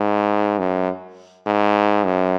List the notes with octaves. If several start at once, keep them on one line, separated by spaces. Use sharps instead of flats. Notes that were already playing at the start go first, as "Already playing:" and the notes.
Already playing: G#2
F#2
G#2
F#2